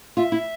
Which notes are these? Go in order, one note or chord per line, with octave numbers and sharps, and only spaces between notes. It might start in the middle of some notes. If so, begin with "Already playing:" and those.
F4 E5
E4